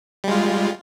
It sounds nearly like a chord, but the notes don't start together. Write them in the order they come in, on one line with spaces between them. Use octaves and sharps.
G3 G#3 F4